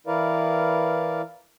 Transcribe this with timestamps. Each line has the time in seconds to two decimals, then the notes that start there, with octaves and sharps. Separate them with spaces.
0.07 E3 E4 A#4 B4 D5 F5